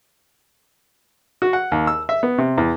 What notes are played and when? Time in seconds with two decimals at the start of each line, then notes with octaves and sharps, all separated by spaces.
1.42 F#4
1.53 F#5
1.72 D#2
1.87 E6
2.09 E5
2.23 B3
2.38 C3
2.58 E2